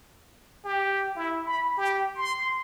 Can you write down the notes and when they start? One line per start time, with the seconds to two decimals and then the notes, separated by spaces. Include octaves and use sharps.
0.65 G4
1.16 E4
1.46 B5
1.78 G4
2.16 C6